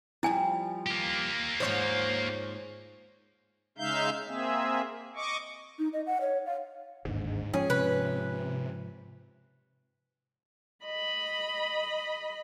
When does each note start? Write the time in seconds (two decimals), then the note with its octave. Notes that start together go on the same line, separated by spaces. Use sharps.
0.23 F3 G3 E4 G#5
0.87 A#3 G4
1.60 G#2 F3 C5 C#5
3.78 C#3 G#3 D#4 E5 F5 G6
4.27 A#3 C4 G#4 E5
5.16 D#5 C#6 D6
5.79 D#4
5.93 D#5
6.07 F#5
6.21 C#5
6.46 F5
7.05 G1 D#2 G#2 D3
7.54 G#2 F3 C#4 G#4
7.70 C3 B4
10.85 D#5 B5